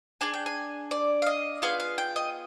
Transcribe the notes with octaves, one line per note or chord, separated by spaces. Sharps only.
D4 G#4 G#5
G5
G#5
D5
F5
D#5
B3 F4 G#4 F5
F5
G5
D#5